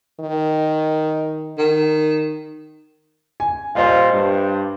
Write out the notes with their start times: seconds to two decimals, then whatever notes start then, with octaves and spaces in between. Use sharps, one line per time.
0.20 D#3
1.58 D#3
3.40 G#5
3.75 A#2 G3 F4 C5 D#5 F5
4.13 G2